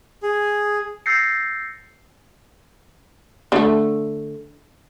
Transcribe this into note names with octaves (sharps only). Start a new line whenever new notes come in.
G#4
E6 G6 A6 A#6 C7 C#7
D3 A3